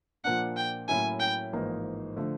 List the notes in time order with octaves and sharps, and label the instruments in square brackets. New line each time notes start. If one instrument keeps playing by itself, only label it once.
[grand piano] A#2 F3 A#3 D4 [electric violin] F#5
[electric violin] G5
[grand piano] A2 F#3 A#3 C#4 E4 [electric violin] G#5
[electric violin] G5
[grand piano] A1 G#2 F3 A#3 D#4
D3 F3 A3